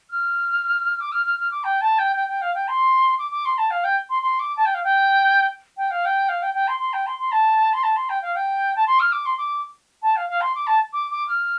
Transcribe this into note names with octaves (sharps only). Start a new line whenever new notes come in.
F6
D6
F6
F6
F6
D6
G5
A5
G5
G5
G5
F5
G5
C6
D6
D6
C6
A5
F5
G5
C6
C6
D6
A5
G5
F5
G5
G5
F5
G5
F5
G5
G5
C6
C6
G5
C6
C6
A5
C6
A5
C6
G5
F5
G5
A5
C6
F6
D6
C6
D6
A5
F5
F5
C6
D6
A5
D6
D6
F6